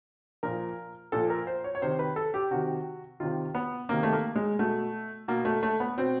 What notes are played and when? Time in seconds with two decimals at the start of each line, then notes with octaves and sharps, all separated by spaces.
0.43 A#2 F3 A#4
1.12 A#2 F3 A4
1.30 A#4
1.47 C5
1.64 C#5
1.75 C#5
1.82 C3 D#3 C5
1.99 B4
2.16 A4
2.34 G4
2.51 C3 D#3 F#4
3.20 C3 D#3 F4
3.55 B3
3.89 C3 D#3 A#3
4.03 A3
4.13 A#3
4.35 G#3
4.59 B2 A3
5.28 B2 A#3
5.45 A3
5.63 A3
5.80 B3
5.97 B2 C4